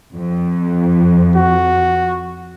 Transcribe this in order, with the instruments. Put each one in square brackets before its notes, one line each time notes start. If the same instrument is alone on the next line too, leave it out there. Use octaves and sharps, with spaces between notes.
[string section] F2
[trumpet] F#4